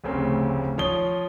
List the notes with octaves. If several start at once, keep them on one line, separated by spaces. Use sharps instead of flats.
F1 D2 C#3 C4
F3 C#5 D#6 G7